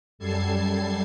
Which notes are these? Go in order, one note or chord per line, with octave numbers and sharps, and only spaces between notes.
F#2 G3 A4 A5 G#6 C7